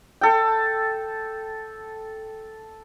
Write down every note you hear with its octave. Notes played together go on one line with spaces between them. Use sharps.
A4 G5